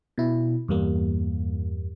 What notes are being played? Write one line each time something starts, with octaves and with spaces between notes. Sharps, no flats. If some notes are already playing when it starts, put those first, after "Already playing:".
B2 E4
E2 G2 G3 A#3